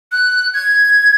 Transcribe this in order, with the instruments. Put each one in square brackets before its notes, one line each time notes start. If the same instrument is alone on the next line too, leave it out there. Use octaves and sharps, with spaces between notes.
[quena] F#6
G#6